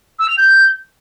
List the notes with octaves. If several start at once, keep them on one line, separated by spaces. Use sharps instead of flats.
E6
F7
G6